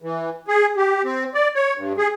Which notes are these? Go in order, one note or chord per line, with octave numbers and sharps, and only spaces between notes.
E3
G#4
G4
C4
D5
C#5
G2
G#4